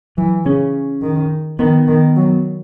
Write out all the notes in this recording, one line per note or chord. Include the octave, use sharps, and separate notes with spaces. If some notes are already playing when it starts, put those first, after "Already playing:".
E3 F#3
C#3 C#4
D#3
D#3 B3
D#3
F#3